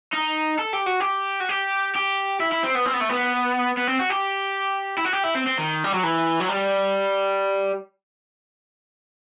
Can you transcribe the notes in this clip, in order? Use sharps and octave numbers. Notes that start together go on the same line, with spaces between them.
D#4
A4
G4
F#4
G4
F#4
G4
G4
E4
E4
C4
B3
C4
B3
A3
B3
B3
C4
F#4
G4
E4
F#4
G4
E4
C4
C4
D#3
G3
F#3
E3
F#3
G3